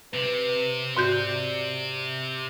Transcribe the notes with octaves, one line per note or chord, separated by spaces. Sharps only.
C3 B4
G#2 F#4 D5 G6